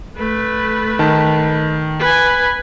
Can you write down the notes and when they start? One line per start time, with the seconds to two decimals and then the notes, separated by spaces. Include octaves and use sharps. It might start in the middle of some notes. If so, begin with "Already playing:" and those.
0.17 A3 B4
0.99 D#3 A5
1.99 B4 G#5